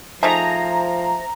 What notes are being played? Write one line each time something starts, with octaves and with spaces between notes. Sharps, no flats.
F3 A3 D#4 G#4 C5 E5 A#5